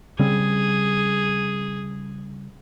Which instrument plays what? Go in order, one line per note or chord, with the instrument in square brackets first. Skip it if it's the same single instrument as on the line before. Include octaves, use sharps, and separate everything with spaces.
[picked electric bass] C#3 G3 C4 [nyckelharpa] G#4